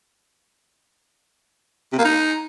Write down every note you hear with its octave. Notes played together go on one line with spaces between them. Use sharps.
C3
A#3
D#4